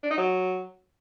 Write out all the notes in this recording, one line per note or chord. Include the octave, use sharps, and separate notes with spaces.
D4
D#4
F#3